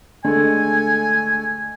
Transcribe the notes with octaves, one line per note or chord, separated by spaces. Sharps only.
D3 G#3 A3 G#5